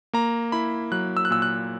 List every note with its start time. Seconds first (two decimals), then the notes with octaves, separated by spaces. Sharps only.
0.13 A#3 A#5
0.52 E4 B5
0.92 F#3 F#6
1.17 E6
1.25 F#6
1.30 A#2 E6
1.42 F#6